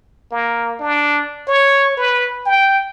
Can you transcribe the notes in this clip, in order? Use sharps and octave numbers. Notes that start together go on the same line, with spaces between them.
A#3
D4
C#5
B4
G5